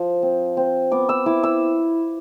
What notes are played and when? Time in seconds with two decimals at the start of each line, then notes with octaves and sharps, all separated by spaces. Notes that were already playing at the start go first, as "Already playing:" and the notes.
Already playing: F3
0.23 C4
0.57 C4
0.92 B3 D6
1.09 E6
1.26 E4 D6
1.44 E6